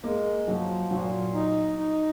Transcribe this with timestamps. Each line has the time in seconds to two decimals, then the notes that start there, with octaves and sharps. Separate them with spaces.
0.04 G#3 A#3
0.47 F3 F#3
0.91 A#2 F#3
1.34 D#4
1.78 D#4